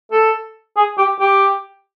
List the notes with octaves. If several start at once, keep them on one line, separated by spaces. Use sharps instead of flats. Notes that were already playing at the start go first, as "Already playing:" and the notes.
A4
G#4
G4
G4